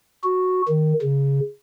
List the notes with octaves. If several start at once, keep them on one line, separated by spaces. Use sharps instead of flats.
F#4
D#3
C#3